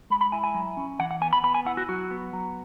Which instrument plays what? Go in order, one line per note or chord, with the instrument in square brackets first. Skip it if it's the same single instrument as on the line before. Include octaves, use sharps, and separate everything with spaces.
[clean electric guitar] G#3 B5
B5
E4 G#5
G#5
F#3
C#4
E3 F#5
F#5
B3 G#5
B5
B3 B5
G#5
E4 F#5
F#4
F#3 F#4
B3
F#3